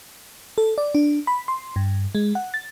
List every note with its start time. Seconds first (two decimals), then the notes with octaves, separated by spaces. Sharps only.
0.58 A4
0.78 D5
0.95 D4
1.27 B5
1.48 C6
1.76 G2
2.15 G#3
2.35 F#5
2.54 A6